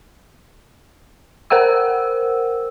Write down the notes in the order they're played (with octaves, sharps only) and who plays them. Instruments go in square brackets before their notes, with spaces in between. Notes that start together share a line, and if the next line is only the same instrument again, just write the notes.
[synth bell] A#4 C5 F#5 G5 E6